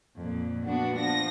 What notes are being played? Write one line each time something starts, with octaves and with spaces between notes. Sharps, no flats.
F2 A#2
B3 D4 F#4
F3 A#6